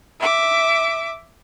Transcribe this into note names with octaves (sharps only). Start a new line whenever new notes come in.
E5 D6